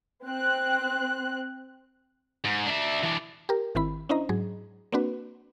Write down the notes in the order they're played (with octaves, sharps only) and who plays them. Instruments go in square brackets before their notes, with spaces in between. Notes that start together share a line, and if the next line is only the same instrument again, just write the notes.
[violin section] C4 F#6
[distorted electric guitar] G#2
D4 E5
E3 D4
[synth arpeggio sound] G4 A#4
G#1 D#3 C4 E4 B5
C#4 D4 E4 C5 D#5 A#5
G#2 F#3 G#4
A#3 C4 D4 F#4 B4